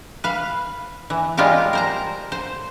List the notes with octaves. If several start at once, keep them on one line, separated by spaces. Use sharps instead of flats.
B4 F5
E3
G3 G#3 F4 G4 A#4 F5
A#4 C5 A#5
C5